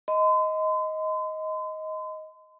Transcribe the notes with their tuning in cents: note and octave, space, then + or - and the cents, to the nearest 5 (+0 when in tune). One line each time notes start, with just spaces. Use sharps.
D#5 +10 C6 -40